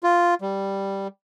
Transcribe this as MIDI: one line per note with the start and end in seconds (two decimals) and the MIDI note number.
0.03 0.34 65
0.41 1.07 55